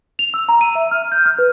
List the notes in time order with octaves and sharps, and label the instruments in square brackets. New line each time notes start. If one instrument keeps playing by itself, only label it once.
[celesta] F7
E6
A#5
D#7
E5
F6
G6
F6
B4